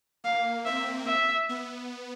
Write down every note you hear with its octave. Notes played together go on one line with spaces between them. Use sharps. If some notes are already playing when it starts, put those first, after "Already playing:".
A#3 F5
C4 E5
E5
B3